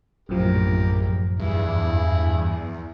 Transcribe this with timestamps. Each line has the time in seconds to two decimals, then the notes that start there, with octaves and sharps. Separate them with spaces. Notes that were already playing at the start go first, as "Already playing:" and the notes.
0.29 A#1 F#2 A2 F3 G4 A#4
1.40 E2 G2 E4 G#4